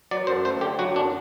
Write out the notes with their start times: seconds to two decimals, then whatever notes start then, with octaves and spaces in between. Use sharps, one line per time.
0.11 F#3 D5
0.27 F#2 C5
0.45 A3 C5
0.61 D3 G4
0.79 F#3 F#4
0.95 F#2 D4